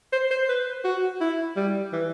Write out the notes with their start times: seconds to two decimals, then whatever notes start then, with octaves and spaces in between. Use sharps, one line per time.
0.13 C5
0.31 C5
0.49 B4
0.84 F#4
1.21 E4
1.56 G3
1.93 E3